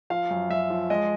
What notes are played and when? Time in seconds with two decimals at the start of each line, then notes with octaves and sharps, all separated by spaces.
0.10 F3 F5
0.30 F#2
0.50 F#2 E5
0.70 F3
0.90 G#3 D#5